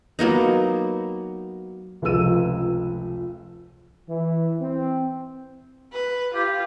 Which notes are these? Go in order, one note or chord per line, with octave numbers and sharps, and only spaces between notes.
F#3 A#3 B3 D#4
F1 C#2 F3 E6 D#7
E3
C4
B4
F4 G4